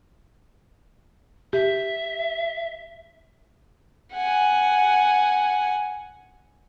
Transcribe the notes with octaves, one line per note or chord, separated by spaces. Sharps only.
G4 E5
F#5 G#5